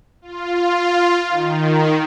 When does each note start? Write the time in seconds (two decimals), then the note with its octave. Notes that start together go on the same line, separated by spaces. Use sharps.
0.22 F4
1.28 D#3